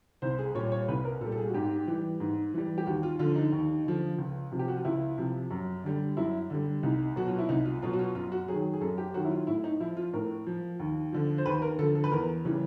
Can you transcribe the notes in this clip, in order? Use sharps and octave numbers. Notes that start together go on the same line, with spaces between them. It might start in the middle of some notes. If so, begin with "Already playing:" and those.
C2 C5
G#4
A#2 G3 C#5
C#5
C2 B4
A#4
A#2 G3 A4
A4
G#4
F#4
G#2 G4
E3 G3
G#2
E3 G3
G4
D#2 F#4
F4
D3 F3 F4
D#4
D#2
D3 F3
C#2
C3 F3
G4
F#4
F4
C#2 E4
C3 F3
F#2
D3 G3
F#2 E4
D3 G3
C2 D#4
B2 F#3 F#4
F4
E4
C2 D#4
F4
B2 F#3 F4
F#4
F4
F#2 F4
F#4
D#3 F#3 G#4
G#4
F#2 A4
G4
D#3 F#3 F#4
E4
F4
A2 E4
D#4
F3 E4
F4
A2 A#4
F3
D#2
D3 F3
C5
D#2 B4
A#4
D3 F3 A4
A4
B4
E2 A#4
C#3 E3 G3